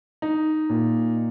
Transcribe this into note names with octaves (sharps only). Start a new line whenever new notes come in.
D#4
A#2